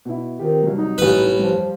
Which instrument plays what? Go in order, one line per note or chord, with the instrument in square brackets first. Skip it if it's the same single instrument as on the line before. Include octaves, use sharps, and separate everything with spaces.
[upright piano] B2 E4
[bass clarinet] D#3 [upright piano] C4 F4 G4
[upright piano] C2 F#3
[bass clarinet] D#4
[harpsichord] A1 B4
[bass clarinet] F3 [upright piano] G3